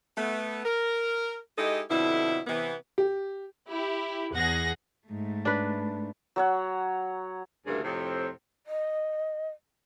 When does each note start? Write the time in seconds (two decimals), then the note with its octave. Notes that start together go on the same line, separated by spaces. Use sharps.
0.17 A3 B3
0.65 A#4
1.58 G#3 D#4 E4 G4 A4 D#5
1.90 F2 B2 D3 E4
2.47 C3 E3 B3
2.98 G4
3.69 E4 G4
4.33 E2 G#4 F#5 A#6
5.07 G#2 A3
5.45 D4 B4
6.36 F#3 C#5 F#5
7.66 D2 G2 C#3 E3 A#3 A4
7.83 F2 A2 C3 C4
8.67 D#5